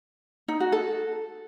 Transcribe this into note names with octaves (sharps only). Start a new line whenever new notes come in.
D#4
F#4
A4